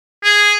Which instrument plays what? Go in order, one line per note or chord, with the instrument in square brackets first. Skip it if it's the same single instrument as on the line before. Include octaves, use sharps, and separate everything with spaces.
[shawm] G#4